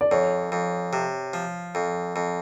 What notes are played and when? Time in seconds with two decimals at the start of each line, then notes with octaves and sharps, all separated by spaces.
0.01 D5
0.11 F2 C#5
0.52 F2
0.93 C3
1.33 F3
1.75 F2
2.16 F2